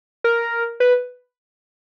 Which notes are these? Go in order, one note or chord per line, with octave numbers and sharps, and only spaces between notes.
A#4
B4